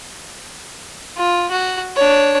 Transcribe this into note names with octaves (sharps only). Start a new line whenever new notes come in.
F4
F#4
D4 C#5